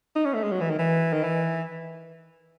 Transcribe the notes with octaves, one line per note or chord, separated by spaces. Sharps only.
D#4
C#4
A3
G#3
F#3
E3
D#3
E3
D#3
E3